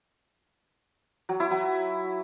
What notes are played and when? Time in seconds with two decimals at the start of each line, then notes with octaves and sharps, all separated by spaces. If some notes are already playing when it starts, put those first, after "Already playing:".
1.29 F#3
1.40 E4
1.51 F#3